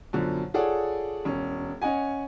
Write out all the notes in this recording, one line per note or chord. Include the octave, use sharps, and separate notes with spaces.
F#2 B2 D3 F3
F4 G#4 A4 C#5 D5 F#5
E1 C#4
C#4 D#5 F#5 G#5